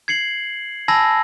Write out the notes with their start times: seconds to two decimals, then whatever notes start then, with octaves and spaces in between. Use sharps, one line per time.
0.08 G#6 C7 C#7 F#7
0.88 G#5 A5 B5 E6 G#6 A#6